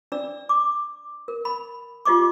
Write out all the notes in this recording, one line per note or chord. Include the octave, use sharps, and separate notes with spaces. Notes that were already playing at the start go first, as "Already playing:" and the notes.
D4 D5 E6
D6
A#4
B5
F4 G4 D#5 C#6 D6